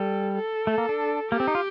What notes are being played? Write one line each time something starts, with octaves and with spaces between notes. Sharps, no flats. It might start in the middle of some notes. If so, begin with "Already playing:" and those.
Already playing: G3 A4
A4
A3
A#3
D4
A#3 G4
C4
D#4
F4